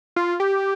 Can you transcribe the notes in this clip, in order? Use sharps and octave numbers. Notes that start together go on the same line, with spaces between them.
F4
G4